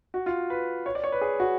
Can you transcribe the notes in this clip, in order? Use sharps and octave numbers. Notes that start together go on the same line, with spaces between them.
F#4
F4
B4
C#5
D5
C#5
B4
G#4
F#4